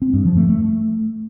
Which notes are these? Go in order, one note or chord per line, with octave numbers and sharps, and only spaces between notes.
C4
G2
F3
A3
A3